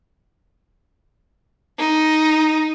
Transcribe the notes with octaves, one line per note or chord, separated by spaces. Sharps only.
D#4